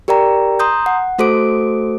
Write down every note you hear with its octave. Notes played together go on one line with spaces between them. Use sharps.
G4 A#4 D5 G5 A#5
A#5 C6 D#6 G6
F#5
A3 F#4 A4 C5 D6 D7